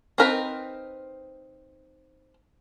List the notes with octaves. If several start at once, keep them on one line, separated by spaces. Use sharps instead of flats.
C4 D#4 A#4 B4